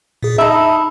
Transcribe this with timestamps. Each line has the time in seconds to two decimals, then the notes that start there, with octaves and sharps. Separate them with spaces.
0.23 A#2 G#4
0.38 D#4 E5 A5 B5